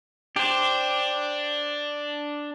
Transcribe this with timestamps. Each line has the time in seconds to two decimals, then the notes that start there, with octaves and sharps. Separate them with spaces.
0.36 D4 G4 C5